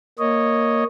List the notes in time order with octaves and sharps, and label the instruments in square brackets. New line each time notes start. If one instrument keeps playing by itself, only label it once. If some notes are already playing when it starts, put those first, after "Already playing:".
[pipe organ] A#3 C#5 D#5